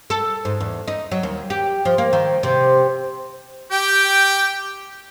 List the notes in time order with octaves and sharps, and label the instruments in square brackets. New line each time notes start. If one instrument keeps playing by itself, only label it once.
[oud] A4
G#2
E2
D#4
F#3
D#2
G4
F3
A#3
D#3
C3
[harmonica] G4 G5